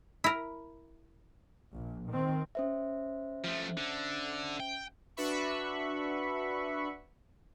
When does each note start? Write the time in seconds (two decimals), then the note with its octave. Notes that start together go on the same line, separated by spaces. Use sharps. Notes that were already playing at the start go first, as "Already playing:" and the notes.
0.24 E4 A#4
1.73 A#1
2.09 D#3 C4
2.55 C#4 C5 E5
3.44 F3 A3
3.77 D3
4.60 G5
5.17 D4 F#4 B4 E5 B5 C#6